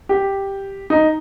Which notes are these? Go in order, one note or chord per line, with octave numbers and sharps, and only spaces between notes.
G4
D#4